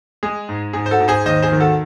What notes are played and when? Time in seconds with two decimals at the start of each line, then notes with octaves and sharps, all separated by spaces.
0.23 G#3 G#4
0.49 G#2
0.73 G#2 G#4
0.86 C5
0.91 F#4 A4
1.00 G#2
1.08 G#4 C5
1.26 D#2 C5 D#5
1.42 G#4 C5
1.52 D#3
1.60 F#4 A4